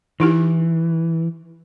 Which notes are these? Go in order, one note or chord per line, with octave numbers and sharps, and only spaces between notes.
E3 D#4 E4 G4